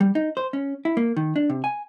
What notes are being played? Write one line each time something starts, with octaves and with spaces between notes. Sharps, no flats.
G3
D#4
C5
C#4
E4
A#3
D#3
D4
C3
G#5